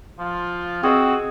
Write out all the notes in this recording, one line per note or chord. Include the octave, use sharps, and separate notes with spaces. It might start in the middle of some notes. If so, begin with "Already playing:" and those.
F3 F4
C4 F#4 G#4 D#5 E6